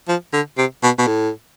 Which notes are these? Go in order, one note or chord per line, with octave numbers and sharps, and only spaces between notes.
F3
D3
C3
B2
B2
A2